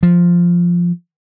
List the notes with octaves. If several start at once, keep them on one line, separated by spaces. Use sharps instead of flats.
F3